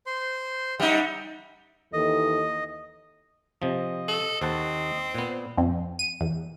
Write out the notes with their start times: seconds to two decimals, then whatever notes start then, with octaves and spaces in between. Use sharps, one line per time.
0.06 C5 C6
0.80 G3 D#4 E5 F#5
1.93 D#2 E3 A4 D#5
3.62 C3 F3 D#5
4.08 A4
4.42 D#2 C4 F#5 A5
5.15 A#2 B3
5.57 F2
5.99 D#7
6.21 E2